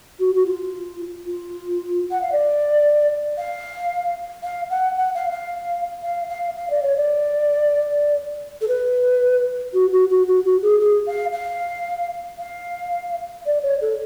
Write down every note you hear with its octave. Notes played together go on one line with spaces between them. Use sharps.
F#4
F#4
F4
F4
F#5
F5
D5
F5
F5
F#5
F#5
F5
F5
F5
F5
F5
D5
C#5
D5
A4
B4
F#4
F#4
F#4
F#4
F#4
G#4
G#4
F5
F5
F5
D5
C#5
A4